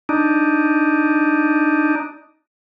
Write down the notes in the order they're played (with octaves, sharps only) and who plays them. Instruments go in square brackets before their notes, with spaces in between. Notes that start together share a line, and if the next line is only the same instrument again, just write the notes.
[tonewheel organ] D4 D#4